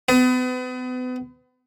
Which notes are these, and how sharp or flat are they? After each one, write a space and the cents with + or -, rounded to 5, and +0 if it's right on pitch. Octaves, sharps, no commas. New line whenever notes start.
B3 +35